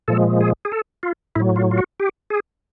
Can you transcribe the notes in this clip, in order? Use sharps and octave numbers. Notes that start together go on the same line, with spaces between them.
A#2 F3 G#3 A4
G#4
G#4
A4
F4
A2 F#3 E4
F4
F4
F#4
G4
G#4